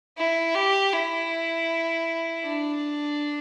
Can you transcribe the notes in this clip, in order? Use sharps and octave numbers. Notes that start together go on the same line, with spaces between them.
E4
G4
E4
D4